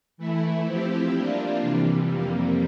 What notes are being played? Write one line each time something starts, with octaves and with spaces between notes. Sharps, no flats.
E3 A3 E4
F3 C4 E4 G4
G3 A#3 D4 F4
C3 E3 G3
F2 C3 G3 A#3